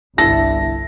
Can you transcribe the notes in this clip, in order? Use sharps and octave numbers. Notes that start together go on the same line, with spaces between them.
G1 C2 D4 E4 A4 A#6